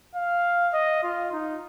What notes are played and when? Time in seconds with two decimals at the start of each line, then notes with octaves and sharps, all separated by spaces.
0.15 F5
0.74 D#5
1.03 F4
1.32 D#4